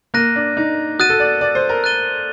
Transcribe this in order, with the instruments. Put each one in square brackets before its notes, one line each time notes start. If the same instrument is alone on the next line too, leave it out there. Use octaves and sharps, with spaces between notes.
[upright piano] A#3 [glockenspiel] F#6 A#6 D#7
[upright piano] D4
D#4
[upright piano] F#4 [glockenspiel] D#6 F#6 A6 D#7
[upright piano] A4
D5
D5
C5
A#4
[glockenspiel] F#6 A6 D#7 G7